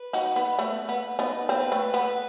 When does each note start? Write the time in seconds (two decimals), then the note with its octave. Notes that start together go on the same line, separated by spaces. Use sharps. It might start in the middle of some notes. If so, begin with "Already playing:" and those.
Already playing: B4
0.13 D#4 F#4
0.36 B3
0.59 A3
0.89 B3
1.19 B3 D#4
1.49 C4 B4
1.72 A3
1.94 B3